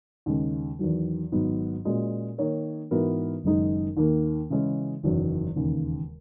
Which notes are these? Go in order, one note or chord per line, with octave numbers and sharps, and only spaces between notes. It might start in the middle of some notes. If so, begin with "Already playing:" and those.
D#2 C#3 G#3 C#4
E2 D#3 F#3
G#1 G#2 F#3 B3
A#2 G#3 C#4 F#4
D#3 A#3 D#4 A#4 C#5
G#2 E3 B3 F#4 A#4
F#1 F#2 D#3 G#3 D#4
D#2 D#3 A#3
C#3 E3 G#3 C#4
F#1 E2 D#3 F#3 C#4
E1 D#2 C#3